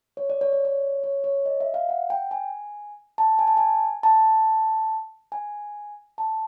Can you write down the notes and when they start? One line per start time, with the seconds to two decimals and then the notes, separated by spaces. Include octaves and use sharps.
0.17 C#5
0.30 D5
0.41 C#5
0.53 D5
0.65 C#5
1.04 C#5
1.24 C#5
1.46 D#5
1.60 E5
1.74 F5
1.89 F#5
2.10 G5
2.31 G#5
3.18 A5
3.39 G#5
3.47 A5
3.57 G#5
4.03 A5
5.32 G#5
6.18 A5